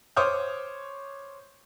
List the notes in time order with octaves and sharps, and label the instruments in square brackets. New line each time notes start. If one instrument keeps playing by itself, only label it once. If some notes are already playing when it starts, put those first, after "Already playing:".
[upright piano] C5 C#5 D6 D#6 F6 G6